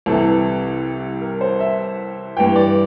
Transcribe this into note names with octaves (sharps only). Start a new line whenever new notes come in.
C2 C3 E3 A4
A#4
C5
E5
G2 E3 G5
D5